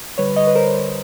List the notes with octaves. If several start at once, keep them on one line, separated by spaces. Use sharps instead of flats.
D3 G3 B4 C#5
C#5 D#5
B4
A#4 C5